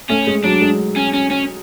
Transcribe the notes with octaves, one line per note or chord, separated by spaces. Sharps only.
A3 C#4
G#3
F#3 D4
G#3
C#4
C#4
C#4